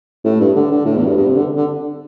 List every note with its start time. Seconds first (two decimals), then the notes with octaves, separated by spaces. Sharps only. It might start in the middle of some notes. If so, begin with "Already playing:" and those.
0.25 A2
0.40 G2
0.56 D3
0.71 D3
0.86 A2
0.96 E2
1.06 G2
1.17 G2
1.27 C3
1.37 D3
1.57 D3